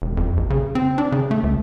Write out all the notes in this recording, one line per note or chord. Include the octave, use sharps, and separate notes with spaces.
E1
F2
A#1
C#3
C4
D4
C#3
A3
C#2